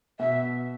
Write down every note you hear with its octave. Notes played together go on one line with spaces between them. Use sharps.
B2 E5